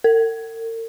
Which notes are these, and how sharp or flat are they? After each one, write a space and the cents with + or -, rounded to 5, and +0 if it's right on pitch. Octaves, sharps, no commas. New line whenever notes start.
A#4 -45